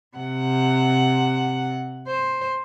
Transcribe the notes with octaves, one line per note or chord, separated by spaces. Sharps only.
C3 F#5
C5